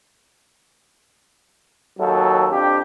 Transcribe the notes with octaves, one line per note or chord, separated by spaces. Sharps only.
D#2 F#3 A4
F2 D4 G4